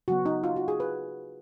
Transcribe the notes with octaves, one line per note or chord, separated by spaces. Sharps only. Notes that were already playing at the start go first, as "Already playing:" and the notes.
C#3 F#3 B3 F#4
D#4
F4
F#4
G#4
B4